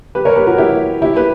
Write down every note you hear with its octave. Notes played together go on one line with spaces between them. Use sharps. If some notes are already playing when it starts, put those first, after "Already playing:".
G4 B4
A#4 C#5
G4 B4
F#4 A#4
E4 G4
E4 G4
G4 B4